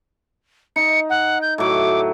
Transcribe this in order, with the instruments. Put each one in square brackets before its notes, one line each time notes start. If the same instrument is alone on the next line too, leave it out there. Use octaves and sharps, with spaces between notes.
[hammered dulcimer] D#4 [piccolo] C#7
[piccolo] F#5
G6
[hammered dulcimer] A2 F#3 [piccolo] D6